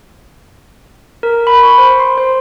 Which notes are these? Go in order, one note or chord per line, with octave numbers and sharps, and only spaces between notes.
A#4
B5
C#6
C5
C6
C5